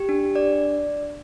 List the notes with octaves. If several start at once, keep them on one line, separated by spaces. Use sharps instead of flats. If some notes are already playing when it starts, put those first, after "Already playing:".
Already playing: G4
D4
D5